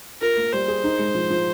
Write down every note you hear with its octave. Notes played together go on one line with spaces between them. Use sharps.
F4 A#4
A#3
G3 C5
G#4
D#4
G#3
F3
F3